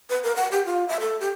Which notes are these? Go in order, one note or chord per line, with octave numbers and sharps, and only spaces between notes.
B4
A#4
F#5
G4
F4
E5
A4
G4